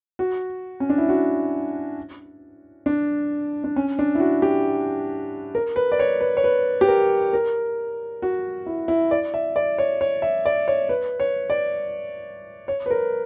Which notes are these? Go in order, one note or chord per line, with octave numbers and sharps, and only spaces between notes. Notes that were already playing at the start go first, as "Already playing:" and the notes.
F#4
C#4
D4
E4
F#4
D4
D4
C#4
D4
E4
F#4
G4
A#4
B4
D5
C#5
B4
C#5
B4
G4
A#4
A#4
F#4
E4
E4
D5
E5
D5
C#5
C#5
E5
D5
C#5
B4
C#5
D5
C#5
B4
A#4